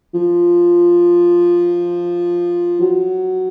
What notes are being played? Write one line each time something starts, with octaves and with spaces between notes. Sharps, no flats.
F3
F#3